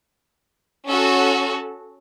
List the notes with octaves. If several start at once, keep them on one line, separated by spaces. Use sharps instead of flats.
C#4 F#4 A4